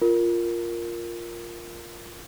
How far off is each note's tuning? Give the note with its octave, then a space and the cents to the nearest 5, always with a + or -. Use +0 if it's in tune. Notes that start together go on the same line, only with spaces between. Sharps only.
F4 +0 A#4 +0